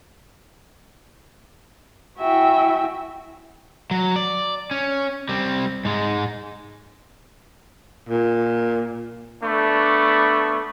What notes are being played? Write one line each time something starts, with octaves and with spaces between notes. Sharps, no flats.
E4 F#4 E5 G5 G#5
F#3
D5
C#4
G3 C4
G#2 G#3
A#2
A3 B3 D4 B5 C#6